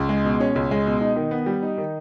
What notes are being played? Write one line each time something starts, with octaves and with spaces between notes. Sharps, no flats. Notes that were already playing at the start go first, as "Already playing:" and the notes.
Already playing: C#2
G#3
B2
C#4
C#2
G#3
B2
D#4
D#3
B3
G3
D#4
D#3